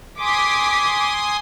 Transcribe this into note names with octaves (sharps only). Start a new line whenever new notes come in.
G#5 C6 D6 D#6 B6